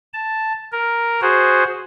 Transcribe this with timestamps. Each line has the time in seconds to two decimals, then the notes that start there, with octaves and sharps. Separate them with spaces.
0.14 A5
0.72 A#4
1.22 F#4 G#4 C5